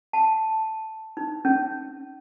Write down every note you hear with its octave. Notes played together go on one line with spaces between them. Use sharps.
A5
D#4
C#4